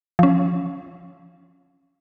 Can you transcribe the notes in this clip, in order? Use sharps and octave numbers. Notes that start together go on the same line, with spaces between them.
F3 C#4